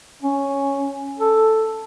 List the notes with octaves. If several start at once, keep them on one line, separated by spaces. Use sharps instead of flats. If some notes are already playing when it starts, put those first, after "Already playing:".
C#4
A4